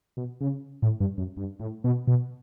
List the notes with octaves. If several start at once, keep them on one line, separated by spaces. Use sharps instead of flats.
B2
C#3
A2
G2
F#2
G2
A2
B2
B2